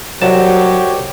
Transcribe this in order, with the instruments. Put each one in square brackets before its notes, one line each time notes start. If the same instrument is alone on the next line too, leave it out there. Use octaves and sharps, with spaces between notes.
[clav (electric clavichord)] C2 A5 [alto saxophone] F#3 [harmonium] F#4 C#5 [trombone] G4